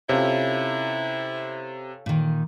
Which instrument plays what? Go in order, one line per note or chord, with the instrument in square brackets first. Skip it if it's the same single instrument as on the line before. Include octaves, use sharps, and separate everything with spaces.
[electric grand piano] C3 [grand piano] C#4 F4 A4 [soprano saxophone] E4
[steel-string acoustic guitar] A#2 D#3